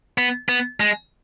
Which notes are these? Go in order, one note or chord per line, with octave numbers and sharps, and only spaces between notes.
B3
B3
G#3